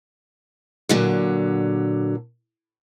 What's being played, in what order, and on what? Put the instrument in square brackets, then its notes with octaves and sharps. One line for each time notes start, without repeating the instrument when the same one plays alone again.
[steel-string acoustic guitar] A#2 D3 F#3